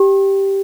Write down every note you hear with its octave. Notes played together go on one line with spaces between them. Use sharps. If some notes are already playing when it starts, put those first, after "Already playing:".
Already playing: G4